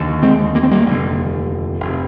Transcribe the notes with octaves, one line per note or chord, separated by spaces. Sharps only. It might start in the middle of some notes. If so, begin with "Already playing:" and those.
Already playing: F1 D#2 D3
G#3 C4
A#3
C4
G3 A#3
F1 D#2 D3
F1 C3